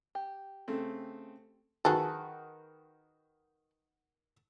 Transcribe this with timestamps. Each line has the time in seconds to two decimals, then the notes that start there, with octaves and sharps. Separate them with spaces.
0.15 G4
0.68 C#3 A3 C4
1.85 D#3 F#4 G#4 A4 B4